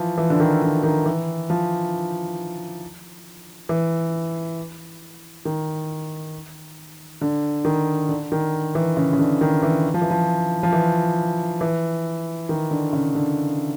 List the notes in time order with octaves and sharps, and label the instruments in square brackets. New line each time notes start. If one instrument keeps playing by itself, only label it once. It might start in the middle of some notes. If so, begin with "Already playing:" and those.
Already playing: [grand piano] E3 F3
E3
D3
D#3
D3
D#3
E3
F3
E3
D#3
D3
D#3
D3
D#3
E3
C#3
C#3
D3
D#3
E3
F3
E3
F3
F3
E3
E3
D#3
D3
C#3
D3